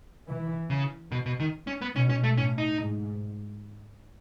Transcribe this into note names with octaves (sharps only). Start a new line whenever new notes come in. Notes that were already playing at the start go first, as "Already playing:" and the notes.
E3
C#3
B2
B2
D#3
C#4
B3
B2 C#4
C#4
A3
A2 C#4
D#4
G#2